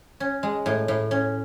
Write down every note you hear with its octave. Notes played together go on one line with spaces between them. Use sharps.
C#4
G#3
A2
A2
C#4